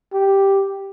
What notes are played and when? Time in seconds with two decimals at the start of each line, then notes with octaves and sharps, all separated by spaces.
0.13 G4